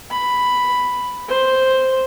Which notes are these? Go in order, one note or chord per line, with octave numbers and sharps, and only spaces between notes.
B5
C5